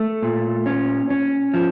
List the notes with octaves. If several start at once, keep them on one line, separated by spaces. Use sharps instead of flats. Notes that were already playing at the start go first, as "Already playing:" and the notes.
Already playing: A3
A#2
C#4
C#4
F3